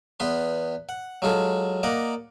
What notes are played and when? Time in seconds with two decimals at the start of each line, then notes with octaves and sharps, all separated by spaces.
0.20 E2 B3 B4 C6
0.89 F#5
1.22 F#3 G#3 F4 A4
1.83 A#3 D5 D#5 F#5 A#5